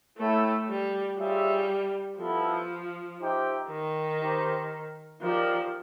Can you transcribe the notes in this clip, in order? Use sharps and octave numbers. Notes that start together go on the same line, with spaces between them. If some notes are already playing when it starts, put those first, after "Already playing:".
A3 E4 A4 C#5 E5 G5
G3
G3 F4 G#4 C#5 E5
F3 B3 E4 A4
D#4 G4 C5 E5 G5
D#3
D#4 G4 C5
F3 D#4 G4 A#4 D5